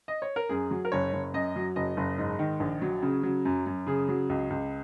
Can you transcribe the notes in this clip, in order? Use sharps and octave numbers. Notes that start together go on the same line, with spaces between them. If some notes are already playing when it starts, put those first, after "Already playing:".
D#5
C#5
A#4
F#2 G#4
F#3
A#4
F#1 C#5
F#1
F#2 D#5
F#3
F#1 D#5
F#1
G#2
D#3
A#1
F#3
C#3
F#3
F#2
F#2
C#3 G#4
F#3
C#2
C#2